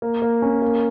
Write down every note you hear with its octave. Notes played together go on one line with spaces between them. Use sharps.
A#3
A#3
C#4
A#3